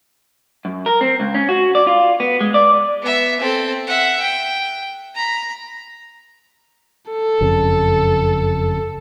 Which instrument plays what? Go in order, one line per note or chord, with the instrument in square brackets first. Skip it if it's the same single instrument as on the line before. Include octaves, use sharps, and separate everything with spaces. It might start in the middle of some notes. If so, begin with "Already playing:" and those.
[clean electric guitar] F#2
A#4
C4
C#2
C#4
F#4
D5
F4
B3
G#3
D5
[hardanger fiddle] B3 E5
C4 A4
E5 F#5
G5
A#5 B5
[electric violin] A4
[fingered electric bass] F#1 F2 C#3